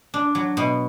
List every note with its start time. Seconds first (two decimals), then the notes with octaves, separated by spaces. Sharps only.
0.14 D4
0.35 F#3
0.57 B2